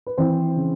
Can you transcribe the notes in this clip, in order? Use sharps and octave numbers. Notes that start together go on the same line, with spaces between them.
B4
E3 C4 C5
C#3